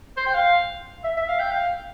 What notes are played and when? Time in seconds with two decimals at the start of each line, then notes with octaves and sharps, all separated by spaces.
0.17 C5
0.26 G5
0.34 F5
1.04 E5
1.16 E5
1.29 F5
1.40 G5
1.51 F5